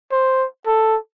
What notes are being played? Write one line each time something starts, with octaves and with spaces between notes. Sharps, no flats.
C5
A4